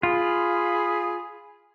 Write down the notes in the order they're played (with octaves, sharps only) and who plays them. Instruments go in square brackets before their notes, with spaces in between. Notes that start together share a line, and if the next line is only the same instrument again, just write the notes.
[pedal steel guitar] F4 [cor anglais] G#4 [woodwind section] B5